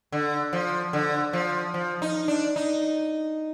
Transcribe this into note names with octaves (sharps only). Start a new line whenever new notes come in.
D3
F3
D3
F3
F3
D#4
D4
D#4